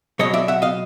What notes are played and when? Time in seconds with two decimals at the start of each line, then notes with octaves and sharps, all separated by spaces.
0.19 B2 F#3 C#5 D#5
0.33 D5 E5
0.48 E5 F#5
0.62 D#5 F5